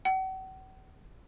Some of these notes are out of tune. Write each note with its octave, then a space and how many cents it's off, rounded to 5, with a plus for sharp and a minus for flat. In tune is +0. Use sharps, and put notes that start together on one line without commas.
F#5 +40